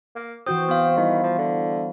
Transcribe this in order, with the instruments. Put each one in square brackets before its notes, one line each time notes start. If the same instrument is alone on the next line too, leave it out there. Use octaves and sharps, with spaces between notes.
[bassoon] A#3
[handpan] E3 F#4 C5 [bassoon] C4 [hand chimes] D#6 G6
[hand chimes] B3 F5
[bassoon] D#3 [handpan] G3 E4
[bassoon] F3
D3